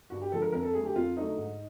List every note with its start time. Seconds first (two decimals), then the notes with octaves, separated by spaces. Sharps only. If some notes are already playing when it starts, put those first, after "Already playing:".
0.10 G2 F#4
0.22 G4
0.31 D3 F3 G#3 A4
0.42 A#4
0.52 F2 A#4
0.63 A4
0.74 D3 F#3 A3 G#4
0.85 G4
0.95 F2 F4
1.16 D3 F#3 A3 D#4
1.38 G#2